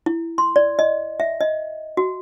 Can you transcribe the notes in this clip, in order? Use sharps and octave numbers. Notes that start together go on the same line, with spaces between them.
E4
C6
D5
D#5
E5
D#5
F#4